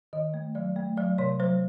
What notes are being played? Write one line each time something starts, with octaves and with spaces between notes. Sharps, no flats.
D#3 D#5
A3
F#3 D5
A3
F#3 D5
C3 C#5
F#3 C5